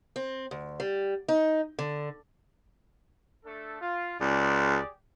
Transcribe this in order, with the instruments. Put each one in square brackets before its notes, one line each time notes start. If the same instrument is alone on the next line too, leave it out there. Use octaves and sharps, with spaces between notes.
[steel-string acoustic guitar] C4
D2
G3
D#4
D3
[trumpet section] A3 D4 A4
F4
[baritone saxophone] C#2 [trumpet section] G4 G#4 D5